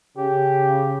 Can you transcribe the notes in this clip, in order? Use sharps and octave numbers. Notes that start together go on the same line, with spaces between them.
C#3 G4